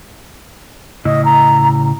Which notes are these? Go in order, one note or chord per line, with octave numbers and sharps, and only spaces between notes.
A2 C#3 E4 D#5
A#5